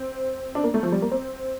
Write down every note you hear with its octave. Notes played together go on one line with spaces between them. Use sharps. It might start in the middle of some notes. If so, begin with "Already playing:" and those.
Already playing: C4
D4
A#3
A3
F3
G3
A#3
C4